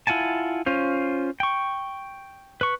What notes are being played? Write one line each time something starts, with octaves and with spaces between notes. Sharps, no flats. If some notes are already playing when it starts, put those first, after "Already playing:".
E4 F4 F#5 G#5 A5
C#4 F4 C5
G5 C#6
B4 C#6